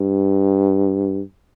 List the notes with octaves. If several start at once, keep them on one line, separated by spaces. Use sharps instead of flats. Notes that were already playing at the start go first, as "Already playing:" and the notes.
Already playing: G2